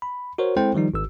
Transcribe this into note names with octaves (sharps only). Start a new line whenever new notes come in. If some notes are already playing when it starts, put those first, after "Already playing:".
B5
F#4 A#4 C5 C#5
G#3 C4 E4 A4 C5 G5
D#3 F3 G3 D#4
G#1 E6